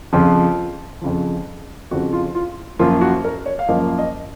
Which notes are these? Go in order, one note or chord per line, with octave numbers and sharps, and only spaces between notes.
F2 C#3 F3 F4
F2 C#3 F3
F2 C#3 F3 F#4
F4
F4
F#2 F3 A#3 F4
F#4
A#4
C#5
F5
F#2 F3 A#3 D#5
D#5